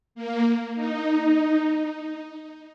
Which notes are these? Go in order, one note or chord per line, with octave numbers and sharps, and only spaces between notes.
A#3
D#4